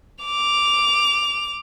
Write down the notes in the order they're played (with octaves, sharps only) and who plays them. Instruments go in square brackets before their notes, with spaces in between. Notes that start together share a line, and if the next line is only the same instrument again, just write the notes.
[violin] D6 F7